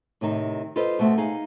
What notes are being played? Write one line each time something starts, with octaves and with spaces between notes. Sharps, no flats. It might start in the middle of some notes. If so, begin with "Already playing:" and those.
A2 C3 D#3 D#4
F4 A4 B4 C5 D#5
B2 A3 C4 F#4
D#4 G#4 F5